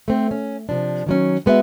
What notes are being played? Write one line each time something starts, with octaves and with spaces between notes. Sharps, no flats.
A3 C4
C#4
C3 F3 D4
D#3 F#3 C#4
G#3 B3 F#4 E5